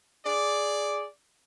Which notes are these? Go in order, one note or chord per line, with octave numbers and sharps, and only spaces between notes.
G#4 D5